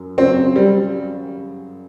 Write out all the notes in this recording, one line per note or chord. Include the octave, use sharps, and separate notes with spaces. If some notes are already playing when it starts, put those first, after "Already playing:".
Already playing: F#2 F#3
F#2 C#3 F#3 C4
G3